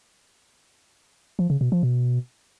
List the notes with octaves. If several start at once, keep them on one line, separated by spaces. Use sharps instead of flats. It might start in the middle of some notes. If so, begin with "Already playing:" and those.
F3
C#3
B2
F3
B2